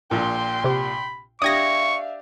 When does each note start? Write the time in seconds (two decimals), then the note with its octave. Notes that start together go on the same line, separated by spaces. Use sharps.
0.11 A#1 A#2 G5 C6
0.64 C3 G4 B5
1.42 D4 G4 E5 F5 C#6 D#6 G#6 A#6